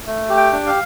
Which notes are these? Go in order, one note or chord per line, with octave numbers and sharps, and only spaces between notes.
A3
G4
G5
D4
F5